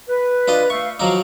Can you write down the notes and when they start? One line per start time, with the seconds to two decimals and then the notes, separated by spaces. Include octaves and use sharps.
0.09 B4
0.48 D4 F4 D#5
0.70 A3 E5 F5 C#6
1.00 F3 F#3 D#4 F5 A#5 D6